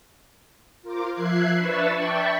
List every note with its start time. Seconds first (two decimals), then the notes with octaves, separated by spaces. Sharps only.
0.82 F4 A#4 C5 D6
1.12 F3 E5 F#6 G#6 C7
1.56 D4 B4 E5 C#6 E6 A6
1.96 D5 E5 G5 A5 B5 C#6